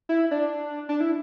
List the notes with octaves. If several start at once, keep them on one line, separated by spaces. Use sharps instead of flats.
E4
D4
D4
E4